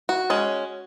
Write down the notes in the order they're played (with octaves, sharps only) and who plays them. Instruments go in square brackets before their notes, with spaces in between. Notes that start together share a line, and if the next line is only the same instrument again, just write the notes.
[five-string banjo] F#4
G#3 C#4